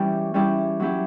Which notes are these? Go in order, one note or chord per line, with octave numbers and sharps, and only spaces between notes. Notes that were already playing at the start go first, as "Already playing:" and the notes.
Already playing: E3 G3 C#4 E4 G4
G3 C#4 E4 G4
F#3 C#4 E4 G4